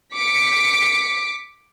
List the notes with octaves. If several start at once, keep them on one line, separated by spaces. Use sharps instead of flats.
D6 B6 C#7